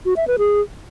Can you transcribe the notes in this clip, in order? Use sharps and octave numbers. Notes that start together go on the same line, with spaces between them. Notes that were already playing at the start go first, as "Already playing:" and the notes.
F#4
E5
B4
G#4